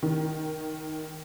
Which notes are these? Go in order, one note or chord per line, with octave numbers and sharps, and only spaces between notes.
D#3